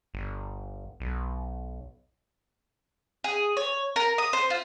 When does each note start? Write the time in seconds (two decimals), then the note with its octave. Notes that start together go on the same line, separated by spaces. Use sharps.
0.14 G1
1.00 B1
3.24 G#4
3.57 C#5
3.96 A#4
4.18 D#6
4.33 C5
4.50 F4